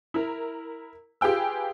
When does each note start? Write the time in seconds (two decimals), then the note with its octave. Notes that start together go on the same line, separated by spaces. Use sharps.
0.14 E4 A#4
1.21 F4 G4 G#4 B4 G5 E6